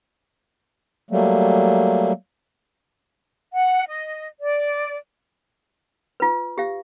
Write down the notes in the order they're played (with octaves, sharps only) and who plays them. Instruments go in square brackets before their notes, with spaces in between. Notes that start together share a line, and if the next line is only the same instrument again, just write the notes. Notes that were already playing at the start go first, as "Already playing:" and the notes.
[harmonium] F#3 G3 A3 A#3
[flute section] F#5
D#5
D5
[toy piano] F4 B4
G4 F5